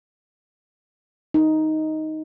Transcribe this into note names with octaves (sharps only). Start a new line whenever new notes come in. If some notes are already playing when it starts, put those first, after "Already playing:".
D#4